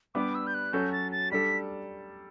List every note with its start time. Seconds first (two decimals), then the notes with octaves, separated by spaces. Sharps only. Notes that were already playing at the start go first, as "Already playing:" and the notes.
0.15 G3 B3 D4 G4 D6
0.35 E6
0.47 G6
0.54 F#6
0.73 F#3 C#4 F#4 A4 G6
0.92 A6
1.12 A6
1.32 G3 D4 A4 B6